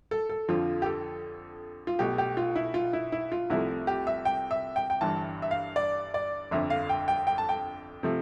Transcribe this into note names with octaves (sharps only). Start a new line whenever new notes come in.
A4
A4
F2 D3 F3 F4
G4
A4
F4
B1 B2 A3 G4
G4
F4
E4
F4
E4
E4
F4
C2 C3 F3 A3 E4
G4
E5
G5
E5
G5
G5
G1 G2 E3 A5
E5
F5
D5
D5
G1 F2 D3 E5
F5
G5
G5
G5
A5
G5
C3 F3 A3